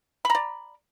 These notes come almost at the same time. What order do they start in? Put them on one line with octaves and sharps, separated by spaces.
B5 A#5 D5